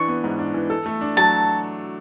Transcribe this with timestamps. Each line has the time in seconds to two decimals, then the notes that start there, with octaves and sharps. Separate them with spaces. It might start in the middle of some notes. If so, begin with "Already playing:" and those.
Already playing: E3 D4 C#6
0.08 B3
0.24 G#2
0.39 D4
0.54 E3
0.70 A4
0.86 A3
1.01 D4
1.17 F#3 A5